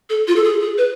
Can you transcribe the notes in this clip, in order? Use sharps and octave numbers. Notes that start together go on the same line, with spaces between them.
A4
F4
A4
G#4
G#4
B4